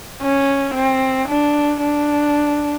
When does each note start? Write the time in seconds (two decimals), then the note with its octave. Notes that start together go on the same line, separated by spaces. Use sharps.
0.22 C#4
0.75 C4
1.28 D4
1.81 D4